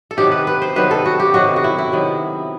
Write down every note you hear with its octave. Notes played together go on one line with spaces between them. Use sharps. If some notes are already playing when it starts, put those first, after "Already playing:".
A4
C3 D#3 F#3 B3 G4
B4
B4
C5
C3 D#3 F#3 B3 B4
A4
F#4
G4
C3 D#3 F#3 B3 F#4
F#4
E4
E4
C3 D#3 F#3 B3